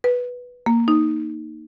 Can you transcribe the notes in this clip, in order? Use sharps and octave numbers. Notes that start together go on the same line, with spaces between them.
B4
A#3
D#4